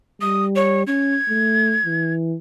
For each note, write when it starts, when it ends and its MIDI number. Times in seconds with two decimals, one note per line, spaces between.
0.21 0.84 55
0.21 0.44 87
0.56 0.83 73
0.87 1.18 61
0.87 2.12 92
1.29 1.78 57
1.85 2.37 52